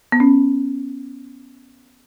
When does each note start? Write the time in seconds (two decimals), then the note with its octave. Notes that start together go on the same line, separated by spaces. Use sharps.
0.12 B3
0.20 C#4